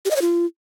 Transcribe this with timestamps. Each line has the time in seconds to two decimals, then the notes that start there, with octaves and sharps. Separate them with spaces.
0.05 G4
0.11 D#5
0.16 C#5
0.22 F4